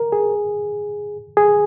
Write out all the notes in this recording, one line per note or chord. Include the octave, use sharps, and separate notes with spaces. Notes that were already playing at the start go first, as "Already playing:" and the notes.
Already playing: A#4
G#4
G#4